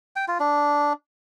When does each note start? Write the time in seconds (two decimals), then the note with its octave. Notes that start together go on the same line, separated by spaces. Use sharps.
0.16 G5
0.28 F4
0.40 D4